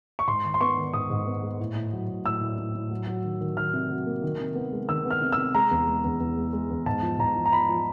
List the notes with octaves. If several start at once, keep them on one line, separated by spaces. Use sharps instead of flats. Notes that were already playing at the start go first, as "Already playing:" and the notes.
C#6
G#2 C6
D#3
C6
B3 C#6
D#3
G#2 D#6
G#2
B3
G#3
A2
A2
F#3
A2
A2 E6
A2
A2
A2
F#3
F#3
D#3
D#3
D#3 F6
C3
F#3
A#3
D#3
C3
B3
G#3
D#3 E6
B3
F6
C3
E6
C3
G#3 A#5
E2
G#3
E2
E2
G#3
G#3
E2
G#2 A5
F3
G#2 A#5
F3
A#5
F3 B5
F3